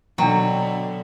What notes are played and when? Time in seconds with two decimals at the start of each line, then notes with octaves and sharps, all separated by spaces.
0.18 B2 D3 F#3 D4 G5 A#5